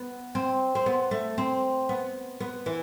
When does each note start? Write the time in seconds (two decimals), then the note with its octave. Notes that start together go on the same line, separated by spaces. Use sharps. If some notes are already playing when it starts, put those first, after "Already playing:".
Already playing: B3
0.35 C4
0.75 C4
0.86 B3
1.11 A3
1.38 C4
1.89 B3
2.40 B3
2.66 E3